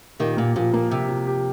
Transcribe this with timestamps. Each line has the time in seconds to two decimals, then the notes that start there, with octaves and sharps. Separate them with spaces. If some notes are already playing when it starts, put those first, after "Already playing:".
0.19 A#2 D#3 G4
0.37 A#2 A#3
0.56 A#2 F3
0.73 A#2 A#3
0.91 C3 G4
1.09 F3
1.27 G4